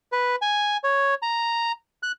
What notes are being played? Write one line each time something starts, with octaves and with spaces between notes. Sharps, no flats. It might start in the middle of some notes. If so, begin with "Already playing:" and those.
B4
G#5
C#5
A#5
F#6